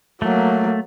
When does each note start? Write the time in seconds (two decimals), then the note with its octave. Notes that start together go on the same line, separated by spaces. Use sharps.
0.22 F#3 A3 A#3